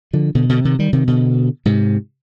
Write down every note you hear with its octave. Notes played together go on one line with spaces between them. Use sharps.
D3 F3
B2 D3
B2 D3
C3 D#3
D#3 G3
C3 D#3
B2 D3
G#2 C3